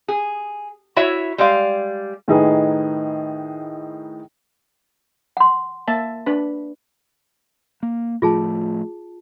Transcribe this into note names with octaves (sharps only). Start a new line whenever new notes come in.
G#4
E4 F#4 C#5 E5
G3 G#3 D5 F5
A2 D#3 D#4 G#4 B4
F#5 C6
A#3 E5 A5
D4 B4 B5
A#3
A2 F3 A3 F4 G#4 A5